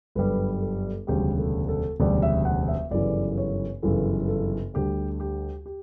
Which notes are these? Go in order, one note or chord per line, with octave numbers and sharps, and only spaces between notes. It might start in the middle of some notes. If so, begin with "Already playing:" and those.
G1 F#2 D3 G3 B4
A4
E1 D2 C#3 G3 G4
A4
A4
E1 D2 C#3 G3 D5
E5
F#5
E5
G1 F#2 C#3 E3 D5
C#5
G1 F#2 C#3 E3 A4
A4
D2 D3 G3 G4
G4
G4